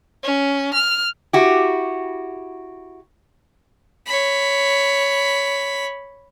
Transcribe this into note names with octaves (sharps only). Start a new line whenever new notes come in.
C#4
F6
E4 F#4 G4
C#5 B5